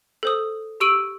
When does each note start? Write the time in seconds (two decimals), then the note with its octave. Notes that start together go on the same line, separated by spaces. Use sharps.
0.23 A4 C5 D#6
0.80 G4 C#6 E6 D7 D#7 F#7